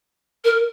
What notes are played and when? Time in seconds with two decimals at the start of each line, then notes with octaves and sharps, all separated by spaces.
0.44 A#4